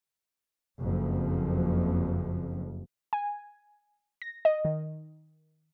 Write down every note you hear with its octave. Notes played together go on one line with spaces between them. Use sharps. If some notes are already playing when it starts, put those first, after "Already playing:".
F#1 F2
G#5
A#6
D#5
D#3